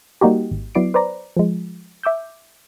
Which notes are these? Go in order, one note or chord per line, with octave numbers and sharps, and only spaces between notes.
G3 A#3 D#4 F#4 G4
G#1
F#3 B3 E4 D5 C7 D7
B4 C5 D5 A#5
F3 G#3
E5 D6 E6 G6